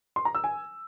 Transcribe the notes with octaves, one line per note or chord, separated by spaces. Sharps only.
C6
A#5
E6
G#5